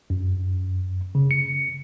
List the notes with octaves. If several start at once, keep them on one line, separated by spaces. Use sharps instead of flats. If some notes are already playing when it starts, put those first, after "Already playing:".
F#2
C#3
C#7